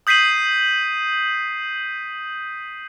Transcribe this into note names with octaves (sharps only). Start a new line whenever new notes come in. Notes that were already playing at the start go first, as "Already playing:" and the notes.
D#6 G6 B6 C7 D#7 F#7